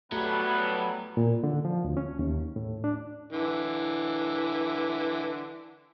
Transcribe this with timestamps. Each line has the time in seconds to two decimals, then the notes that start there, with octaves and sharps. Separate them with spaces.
0.12 A2 F#3 G3 A3 B3 B4
1.17 A#2
1.44 D3
1.65 F3
1.85 D2
1.97 C#4
2.19 D#2
2.56 A2
2.84 D4
3.33 D3 E3